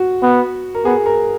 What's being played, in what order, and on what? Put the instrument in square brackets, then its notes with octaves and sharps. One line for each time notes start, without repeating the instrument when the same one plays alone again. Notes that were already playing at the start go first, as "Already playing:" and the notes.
Already playing: [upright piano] F#4
[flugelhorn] B3
[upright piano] A#4
[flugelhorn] B3 [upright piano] G#4
[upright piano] A#4